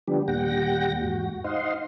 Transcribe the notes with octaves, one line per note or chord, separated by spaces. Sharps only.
D3 F3 G3 B3 D4 G4
D#2 A#2 G3 F#5 G5 A#6
E2 G#2 F#4
D#4 C5 D#5 F5 F#5 C6